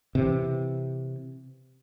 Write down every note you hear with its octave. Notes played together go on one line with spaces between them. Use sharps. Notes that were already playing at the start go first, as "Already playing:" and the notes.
C3 E3